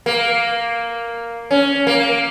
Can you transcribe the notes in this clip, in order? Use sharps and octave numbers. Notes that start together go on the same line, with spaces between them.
A#3
C#4
A#3